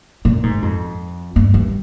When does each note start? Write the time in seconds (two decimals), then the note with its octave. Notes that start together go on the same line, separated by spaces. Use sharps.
0.25 A#2
0.43 G#2
0.62 F2
1.36 G2
1.54 G2